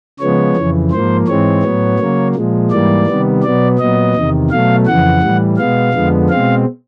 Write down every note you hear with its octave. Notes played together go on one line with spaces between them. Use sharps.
C#3 F3 G#3 B3 C#5
F2 C#3 E3
G#2 F3 A#3 C5
G#2 E3 G#3 C4 C#5
A2 F#3 B3
C#3 F#3 A#3
A#2 F3 G#3
G#2 E3 G3 A#3 D5
C3 D#3 G3 B3
B2 F#3 B3 D5
A#2 F#3 B3 D#5
E2 C3 D#3
B2 F#3 A3 F5
F2 C#3 E3 F#5
A2 E3 G3
B2 G#3 B3 F5
F2 D3 F3 G#3 B3
B2 G#3 C4 F5